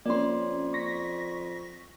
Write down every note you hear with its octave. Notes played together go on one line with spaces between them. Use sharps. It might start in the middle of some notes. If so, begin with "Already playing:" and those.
F2 A#3 C#4 D5 C6
C#6 A#6 B6